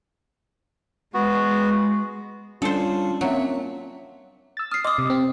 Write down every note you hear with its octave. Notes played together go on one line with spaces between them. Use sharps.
G#3 B3 F#4
G3 C#4 D4 F4 A4 C5
F#3 A#3 C4 C#4 E5
E6 A6
D#6 F6 C7
D#5 C6 D6 D#6
C3
C4